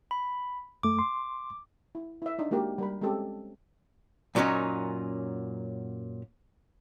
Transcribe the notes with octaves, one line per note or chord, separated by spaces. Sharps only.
B5
F#2 A3 D6
C6
E4
E4 E5
D4 D#4
G#3 A#3 F#4 G4 A#4
G3 A#4 B5
G#3 C4 C#4 G4 A4
F#2 A#2 F#3 G3 C#4 D#4